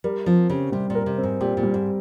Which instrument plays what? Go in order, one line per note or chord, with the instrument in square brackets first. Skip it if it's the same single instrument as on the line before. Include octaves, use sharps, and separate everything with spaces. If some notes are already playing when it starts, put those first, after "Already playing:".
[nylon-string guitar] G3 [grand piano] A#4
[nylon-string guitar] F3 [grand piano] C4
[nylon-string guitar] C#3 [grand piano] G4
[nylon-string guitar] C3 [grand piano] G3
[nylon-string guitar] A#2
[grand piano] A#4
[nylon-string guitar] C3
[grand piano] C4
[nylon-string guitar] G#2
[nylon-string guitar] A#2 [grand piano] G4
[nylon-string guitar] A#2
[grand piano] G3
[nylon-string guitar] G#2